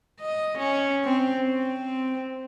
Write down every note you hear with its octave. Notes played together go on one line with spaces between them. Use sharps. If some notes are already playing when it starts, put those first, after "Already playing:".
D#5
C#4
C4
C4